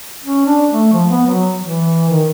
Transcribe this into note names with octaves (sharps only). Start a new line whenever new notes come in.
C#4
D4
A3
F3
B3
F#3
E3
D#3